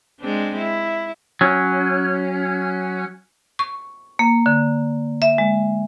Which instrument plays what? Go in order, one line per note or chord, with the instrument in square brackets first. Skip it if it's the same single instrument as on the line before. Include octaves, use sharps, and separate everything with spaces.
[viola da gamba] G#3 C4 D4
E4
[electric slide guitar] F#3 C#4
[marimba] C#6
A#3
D3
E5
G#3